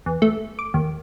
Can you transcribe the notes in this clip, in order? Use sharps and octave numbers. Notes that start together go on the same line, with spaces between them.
E2
A3
D6
D#2